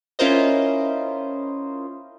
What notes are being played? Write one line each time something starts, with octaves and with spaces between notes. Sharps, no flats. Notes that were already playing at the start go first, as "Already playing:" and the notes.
C#4 E4 F4 A#4 C5 D#5